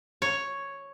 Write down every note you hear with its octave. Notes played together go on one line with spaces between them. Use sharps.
C#5